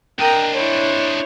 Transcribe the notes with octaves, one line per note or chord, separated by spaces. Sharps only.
D4 A#4 D#5 G5 A#5
E4 C5 C#5